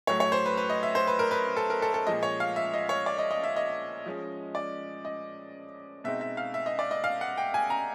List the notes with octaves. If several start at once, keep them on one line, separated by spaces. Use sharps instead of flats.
A2 F#3 A3 C#5
C#5
C5
B4
B4
D#5
E5
C5
B4
A#4
B4
A4
A#4
A4
A4
A#2 F3 G#3 D#5
C#5
F5
E5
D#5
C#5
D5
D#5
D#5
E5
D#5
F3 G#3 C#4
D5
D#5
B2 G#3 C4 D#4 E5
E5
F5
E5
D#5
D5
D#5
F5
F#5
G5
G#5
A#5